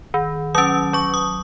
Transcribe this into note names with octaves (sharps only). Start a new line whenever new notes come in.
D#3
F#3 C#4 D#6
F#3 C#6
D#6